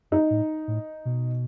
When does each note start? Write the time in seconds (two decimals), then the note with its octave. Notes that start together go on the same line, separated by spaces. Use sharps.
0.11 F#2 D#4
0.30 A2
0.68 A2
1.05 B2